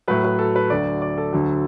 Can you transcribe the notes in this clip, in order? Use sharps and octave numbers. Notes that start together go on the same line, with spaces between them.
A2 F#3 B4
B4
A4
B4
D2 D3 F#3 D5
D5
A4
D2 D3 F#3